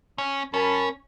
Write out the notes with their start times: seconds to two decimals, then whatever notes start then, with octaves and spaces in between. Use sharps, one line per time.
0.18 C#4
0.54 F#2 C#4 A#4 A5 B5